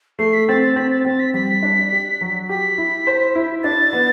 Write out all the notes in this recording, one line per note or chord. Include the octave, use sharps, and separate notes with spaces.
A3 C7
B6
C4 A6
A6
C4 B6
A6
C4 A6
B6
G3 B6
D4
G4
F#3
G4 B6
E4
C5
E4
D4 A6
B3